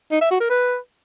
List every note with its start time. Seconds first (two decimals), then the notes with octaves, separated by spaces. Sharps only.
0.11 D#4
0.21 E5
0.31 F#4
0.40 A#4
0.50 B4